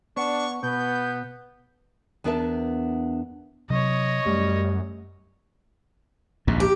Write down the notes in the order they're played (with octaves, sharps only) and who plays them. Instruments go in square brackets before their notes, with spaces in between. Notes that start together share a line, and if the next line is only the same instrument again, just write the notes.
[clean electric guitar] B3 [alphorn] D4 [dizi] C#6
[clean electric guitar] B2 [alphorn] B3 [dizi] G6
[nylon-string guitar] E2 B3 D4 A#4 E5 A5
[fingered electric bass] C3 F#3 [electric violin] C#5 D#5
[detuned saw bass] F#2 [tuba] G3 [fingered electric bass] A3
[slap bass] A#1 D#2 G#2
[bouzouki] G4